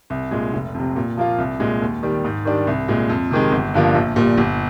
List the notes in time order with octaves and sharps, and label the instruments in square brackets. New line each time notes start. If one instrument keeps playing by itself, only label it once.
[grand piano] C2
A#2 G#3
F1
F2 C3
A#2
F3 A#3 F4
C2
A#2 G#3
D#2
D#3 G3
G#2
D#3 G3 D4
C2
A#2 G#3
F2
C3 D#3 G#3
G1
G2 D3 F3 A#3
A#1
A#2 G3
G1